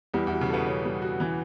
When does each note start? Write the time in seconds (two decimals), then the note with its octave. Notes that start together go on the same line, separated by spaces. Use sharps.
0.14 E2 E3 G3
0.27 E2 E3
0.32 F#4
0.41 C#3
0.50 B2 B3 A4
0.67 C#4
0.85 G3
1.02 F#4
1.20 E3